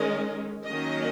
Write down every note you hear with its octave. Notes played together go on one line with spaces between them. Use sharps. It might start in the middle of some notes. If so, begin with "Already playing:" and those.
Already playing: D#3 G#3 C#4 A#4 D#5
D#3 F#3 A#3 C#4 A#4 D#5